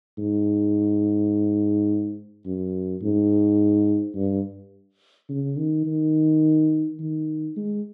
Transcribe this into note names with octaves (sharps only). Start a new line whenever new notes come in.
G#2
F#2
G#2
G2
C#3
D#3
D#3
D#3
G#3